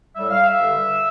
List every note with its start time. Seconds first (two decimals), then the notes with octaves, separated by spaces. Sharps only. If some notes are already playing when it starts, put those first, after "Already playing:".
0.15 A2 G3 E5
0.30 F5
0.45 E5
0.58 G2 D3 G3